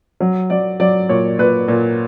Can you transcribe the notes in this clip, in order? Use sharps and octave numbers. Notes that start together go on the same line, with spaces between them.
F#3
F#3 D5
F#3 D5
A#2 C#5
A#2 B4
A#2